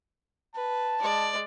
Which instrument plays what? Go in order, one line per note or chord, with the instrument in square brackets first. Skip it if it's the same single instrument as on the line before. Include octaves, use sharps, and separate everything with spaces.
[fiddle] B4 [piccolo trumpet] A5
[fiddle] G#3 D5